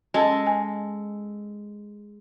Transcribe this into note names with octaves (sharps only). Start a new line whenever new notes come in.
G#3 C#4 A4 D#5
G#5